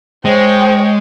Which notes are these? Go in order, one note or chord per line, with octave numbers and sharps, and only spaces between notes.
G#3 C5 C#5 G5